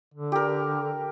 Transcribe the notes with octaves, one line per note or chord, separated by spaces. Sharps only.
D3
G4 A#4